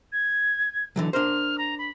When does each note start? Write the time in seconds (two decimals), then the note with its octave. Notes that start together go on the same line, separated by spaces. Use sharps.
0.12 G#6
0.96 D3 E3 F#3
1.13 D4 A#4 C5 F6
1.57 A#5
1.78 B5